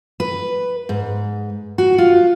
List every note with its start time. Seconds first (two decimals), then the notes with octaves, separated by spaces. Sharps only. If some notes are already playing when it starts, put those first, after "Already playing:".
0.20 B4
0.89 G#2
1.78 F#4
1.98 F4